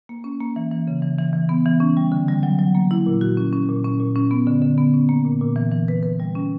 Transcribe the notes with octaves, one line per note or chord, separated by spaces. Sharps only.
A#3
C#4
A#3
E3
E3
C#3
E3
E3
E3
B3
E3
C#4
G3
D3
G3
F#3
F#3
A#3
E4
A#2
F#4
C#4
C#4
A#2
C#4
A#2
C#4
B3
D3
D3
B3
C#4
A#3
A#2
A#2
E3
E3
B4
B4
G3
C#4